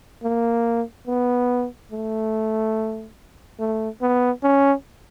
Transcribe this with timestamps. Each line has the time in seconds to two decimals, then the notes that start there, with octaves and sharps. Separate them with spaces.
0.23 A#3
1.07 B3
1.91 A3
3.59 A3
4.01 B3
4.43 C#4